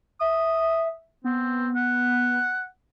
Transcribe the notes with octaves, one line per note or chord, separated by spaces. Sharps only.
E5 D#6
B3 C4
F#5